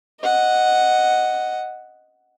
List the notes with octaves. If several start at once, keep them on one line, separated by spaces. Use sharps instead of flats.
D#5 F#5